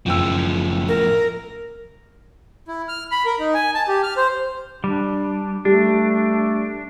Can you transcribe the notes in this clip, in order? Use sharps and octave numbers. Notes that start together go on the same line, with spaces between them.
F#1 A2 F3 G5 E6
A#4
E4
F6
B5
A#4
D#4
G#5
A5
G4
F6
C5
G3 D4
G3 A3 D4